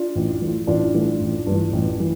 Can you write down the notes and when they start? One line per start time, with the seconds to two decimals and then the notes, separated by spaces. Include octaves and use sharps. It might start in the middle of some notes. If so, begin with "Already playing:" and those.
Already playing: D4 F4
0.16 A1
0.42 A2 E3
0.67 A1 D4 F4
0.94 A2 E3
1.21 A1
1.47 G2 E3
1.73 A1
2.00 E3